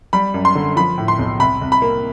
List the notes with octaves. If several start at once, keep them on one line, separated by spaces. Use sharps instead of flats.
G3 B5
F#2
C6
D3
F3 B5
A2
C6
B1
C2 B5
C2
B5
A#3